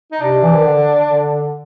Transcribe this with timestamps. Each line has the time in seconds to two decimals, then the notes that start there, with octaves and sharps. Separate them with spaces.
0.12 D#4
0.20 C3 D4
0.42 E3
0.55 D#3
0.65 D3
1.07 D3